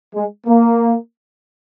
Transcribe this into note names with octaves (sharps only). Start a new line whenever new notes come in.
G#3
A#3